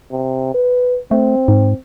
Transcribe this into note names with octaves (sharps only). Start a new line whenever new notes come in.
C3
B4
A3 C4
G#2